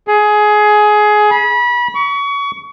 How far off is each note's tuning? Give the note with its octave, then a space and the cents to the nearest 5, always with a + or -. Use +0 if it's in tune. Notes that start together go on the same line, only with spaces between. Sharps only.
G#4 +20
B5 -30
C#6 +30